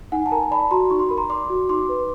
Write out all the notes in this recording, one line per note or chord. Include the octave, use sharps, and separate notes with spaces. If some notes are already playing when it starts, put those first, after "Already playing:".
D#4 F#5 G#5
A5
A#4 G#5 A#5
D5 A5 B5
F#4 A#5 C6
D#4 C#6
C6
A#4 B5
A#5 C6
D5 C6 D6
F#4
D#4 C6 D6
B4